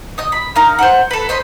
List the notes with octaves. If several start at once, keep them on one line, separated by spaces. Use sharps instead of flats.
D#5 D#6
B5
D#4 A#4 F5
C5 F#5
A4 B4
C5 D#5 B5 C6